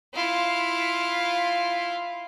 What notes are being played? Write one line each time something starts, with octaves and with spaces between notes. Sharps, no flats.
E4 F4